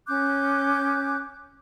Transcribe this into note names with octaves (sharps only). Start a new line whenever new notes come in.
C#4 D6 F#6 G6